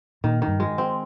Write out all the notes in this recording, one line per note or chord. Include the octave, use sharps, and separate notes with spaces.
A#2 D#3
D#3
G2
G#3
C4